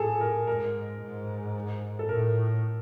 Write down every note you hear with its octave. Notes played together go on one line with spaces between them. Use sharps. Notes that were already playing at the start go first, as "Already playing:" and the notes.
Already playing: A2 G#4 A4
A#4
G#2 A#4
G#2
A4
A2 A#4